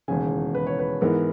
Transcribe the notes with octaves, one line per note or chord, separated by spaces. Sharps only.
E1 D#2 C#3 G#5
B4
C#5
B4
G#2 E3 B3 A#4